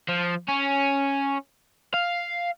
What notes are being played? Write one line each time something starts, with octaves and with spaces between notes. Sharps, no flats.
F3
C#4
F5